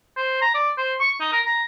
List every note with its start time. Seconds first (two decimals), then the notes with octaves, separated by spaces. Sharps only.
0.17 C5
0.42 A#5
0.54 D5
0.78 C5
1.00 C#6
1.20 D#4
1.32 A#4
1.46 A#5